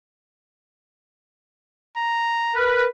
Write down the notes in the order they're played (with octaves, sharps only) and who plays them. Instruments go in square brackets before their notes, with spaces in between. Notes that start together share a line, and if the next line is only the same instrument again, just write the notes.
[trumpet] A#5
[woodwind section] A#4 B4